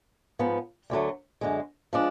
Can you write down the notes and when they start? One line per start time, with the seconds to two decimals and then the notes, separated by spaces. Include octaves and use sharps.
0.39 G#2 F3 B3
0.90 D2 D3 F#3 A3
1.41 F#2 D3 G#3
1.93 F3 G#3 D4